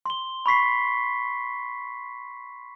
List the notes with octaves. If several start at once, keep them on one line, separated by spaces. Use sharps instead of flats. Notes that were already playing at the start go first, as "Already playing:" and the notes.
C6 G7
B5 C#6 B6 C7